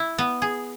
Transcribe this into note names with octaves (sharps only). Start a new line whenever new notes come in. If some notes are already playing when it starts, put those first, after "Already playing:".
Already playing: E4
B3
G#4